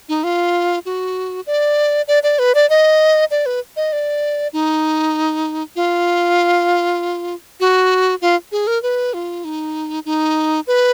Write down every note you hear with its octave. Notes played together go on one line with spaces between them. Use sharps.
D#4
F4
F#4
D5
D5
D5
B4
D5
D#5
D5
B4
D#5
D5
D#4
F4
F#4
F4
G#4
A#4
B4
F4
D#4
D#4
B4